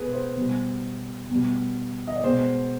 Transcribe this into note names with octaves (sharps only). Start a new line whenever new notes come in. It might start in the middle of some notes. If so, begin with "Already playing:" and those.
Already playing: B2 G#3 G#4 B4
C5
B2 G3
B2 G3
D#5
D5
B2 G#3 C5